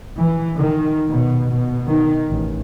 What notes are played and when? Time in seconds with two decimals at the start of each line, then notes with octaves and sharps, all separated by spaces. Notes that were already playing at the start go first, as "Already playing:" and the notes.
0.18 E3
0.57 D#3
1.09 B2
1.52 B2
1.89 D#3
2.27 A1